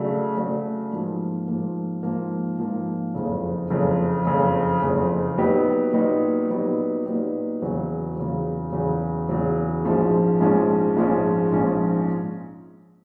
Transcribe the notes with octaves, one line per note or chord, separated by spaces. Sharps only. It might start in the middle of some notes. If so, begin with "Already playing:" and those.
Already playing: C#3 F#3 A3 D4
C#3 F#3 A3 D4
G#2 F3 A#3
G#2 F3 A#3
G#2 F3 A#3
G#2 F3 A#3
F#1 F2 C#3
F#1 F2 C#3
F#1 F2 C#3
F#1 F2 C#3
A#2 F#3 B3 D#4 G4
A#2 F#3 B3 D#4 G4
A#2 F#3 B3 D#4 G4
A#2 F#3 B3 D#4 G4
E2 C#3 F#3
E2 C#3 F#3
E2 C#3 F#3
E2 C#3 F#3
A#1 G#2 F3 G#3 C#4
A#1 G#2 F3 G#3 C#4
A#1 G#2 F3 G#3 C#4
A#1 G#2 F3 G#3 C#4